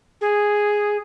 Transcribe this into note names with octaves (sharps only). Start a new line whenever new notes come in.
G#4